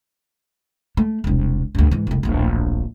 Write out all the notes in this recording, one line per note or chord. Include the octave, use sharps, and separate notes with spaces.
A3
E1 C2
D2 G2
G#2 E3
F1 C2
D1 A#1